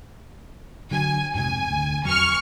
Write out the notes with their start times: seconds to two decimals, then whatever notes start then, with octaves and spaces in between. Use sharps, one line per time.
0.91 D3 F#3 G#5
1.34 F2 G#2 C3 G#5
1.69 D2
2.05 F2 F#3 C#6 F6